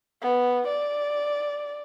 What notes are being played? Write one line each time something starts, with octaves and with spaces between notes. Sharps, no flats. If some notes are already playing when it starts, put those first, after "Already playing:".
B3
D5